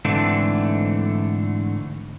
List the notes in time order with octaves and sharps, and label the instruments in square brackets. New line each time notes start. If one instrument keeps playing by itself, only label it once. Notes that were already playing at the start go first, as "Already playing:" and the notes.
[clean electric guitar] G#2 D3 E3 A3 C4 D4